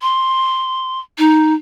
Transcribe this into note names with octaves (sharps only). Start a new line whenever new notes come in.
C6
D#4